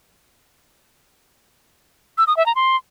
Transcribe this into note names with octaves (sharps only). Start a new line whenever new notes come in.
E6
D#6
E5
A#5
C6